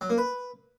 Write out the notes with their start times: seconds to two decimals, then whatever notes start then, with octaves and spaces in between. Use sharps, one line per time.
0.01 F#3
0.10 A#3
0.18 B4